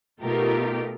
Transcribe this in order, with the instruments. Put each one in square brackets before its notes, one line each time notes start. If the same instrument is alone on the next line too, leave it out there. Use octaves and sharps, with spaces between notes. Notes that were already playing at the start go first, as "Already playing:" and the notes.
[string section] B2 A3 D#4 F4 G4 A#4